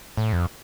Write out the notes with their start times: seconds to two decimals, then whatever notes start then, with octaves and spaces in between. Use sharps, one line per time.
0.17 A2
0.33 F2